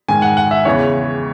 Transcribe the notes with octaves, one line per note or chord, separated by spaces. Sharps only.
G#2 D#3 G#5
F#5
F#5
E5
E2 C#3 E3 C#5